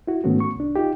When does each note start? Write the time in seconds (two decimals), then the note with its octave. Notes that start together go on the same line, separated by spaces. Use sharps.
0.07 E4 F#4
0.24 G#2 D#3 A3 B3 C#4 F#4
0.40 C#6
0.55 C2 D4
0.76 D#4 F4 G4